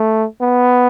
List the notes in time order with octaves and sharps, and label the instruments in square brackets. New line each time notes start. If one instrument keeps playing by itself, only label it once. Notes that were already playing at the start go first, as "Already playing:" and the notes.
Already playing: [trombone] A3
B3